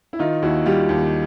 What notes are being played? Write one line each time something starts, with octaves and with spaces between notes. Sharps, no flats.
E4
D#3 D#4 F4
D#2 E4 F#4
G3 F4 G4
D#2